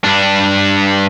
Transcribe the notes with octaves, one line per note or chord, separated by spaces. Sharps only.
G2 D4